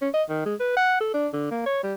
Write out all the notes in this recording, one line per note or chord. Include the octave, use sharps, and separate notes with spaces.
C#4
D#5
D#3
G#3
B4
F#5
A4
D4
D3
A#3
C#5
G3